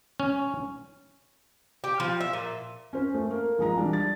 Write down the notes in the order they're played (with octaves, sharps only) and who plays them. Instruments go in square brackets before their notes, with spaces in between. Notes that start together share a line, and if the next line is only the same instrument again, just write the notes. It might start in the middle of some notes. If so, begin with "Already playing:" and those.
[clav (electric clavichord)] C#4
[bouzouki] G4
F3
E5
A#2
[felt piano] C#4 C5
A3
A#3
A#1 G#3 A#5
E3 G3 D4
A6